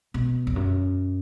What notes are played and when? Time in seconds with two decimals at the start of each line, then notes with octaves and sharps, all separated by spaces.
0.14 B2
0.47 E2
0.56 F#2